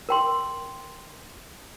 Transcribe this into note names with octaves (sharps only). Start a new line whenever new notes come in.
A#4 G5 C6